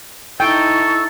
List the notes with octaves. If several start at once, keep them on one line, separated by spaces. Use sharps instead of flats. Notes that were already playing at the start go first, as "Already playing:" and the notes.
D#4 E4 A4 G5 C#6